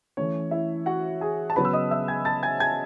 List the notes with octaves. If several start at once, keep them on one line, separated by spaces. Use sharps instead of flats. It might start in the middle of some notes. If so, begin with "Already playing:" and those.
E3 A3 C#4 C#5
E4 E5
F#4 F#5
G#4 G#5
A5
C#3 F#3 B3 B4 B5
E6
D#5 D#6
E5 E6
G#5 G#6
A5 A6
G#5 G#6
G#5 G#6